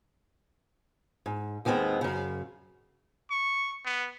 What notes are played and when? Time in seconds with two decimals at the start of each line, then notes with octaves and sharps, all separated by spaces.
1.26 G#2
1.65 D#2 D#3 G#3 B3 C4
2.01 F#2 C#3
3.31 C#6
3.85 B3